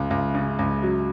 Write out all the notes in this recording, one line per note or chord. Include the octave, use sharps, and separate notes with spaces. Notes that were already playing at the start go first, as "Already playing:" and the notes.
Already playing: C#2
C#2
C#3
C#2
F#3